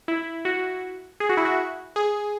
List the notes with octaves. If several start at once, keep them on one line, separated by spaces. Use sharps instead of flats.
E4
F#4
G#4
F#4
E4
F#4
G#4